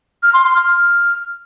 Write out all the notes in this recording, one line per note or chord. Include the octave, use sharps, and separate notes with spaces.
F6
C6
C6
F6
F6